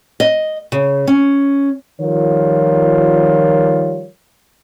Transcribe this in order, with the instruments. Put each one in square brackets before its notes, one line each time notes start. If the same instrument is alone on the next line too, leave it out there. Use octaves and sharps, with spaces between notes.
[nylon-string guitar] D#5
C#3
C#4
[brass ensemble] D#3 F3 G3 F4 A#4 C#5